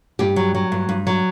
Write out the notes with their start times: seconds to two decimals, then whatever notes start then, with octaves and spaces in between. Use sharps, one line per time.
0.19 G2 G4
0.36 F#3
0.54 F#3
0.72 G2
0.89 G2
1.07 F#3